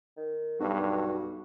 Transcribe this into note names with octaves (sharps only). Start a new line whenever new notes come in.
D#3
B1 G2 F#4